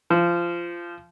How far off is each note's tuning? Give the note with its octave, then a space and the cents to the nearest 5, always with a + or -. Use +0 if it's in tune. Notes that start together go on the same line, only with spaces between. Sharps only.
F3 -20